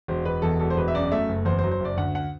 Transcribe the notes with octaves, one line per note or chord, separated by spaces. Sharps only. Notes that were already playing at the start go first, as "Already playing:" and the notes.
E1 C5
E1 B4
E2 A4
E1 A4
C5
E1 B4
E5
F#2 D5
A3 E5
F#1
E2 C5
C5
F#3
C5
F#1 D5
D2 F#5
F#5